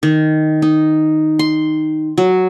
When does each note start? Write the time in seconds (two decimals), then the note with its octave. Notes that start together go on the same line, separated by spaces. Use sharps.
0.03 D#3
0.62 D#4
1.39 C6
2.18 F#3